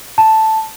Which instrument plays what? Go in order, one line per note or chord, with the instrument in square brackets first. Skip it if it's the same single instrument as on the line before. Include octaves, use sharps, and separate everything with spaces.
[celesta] A5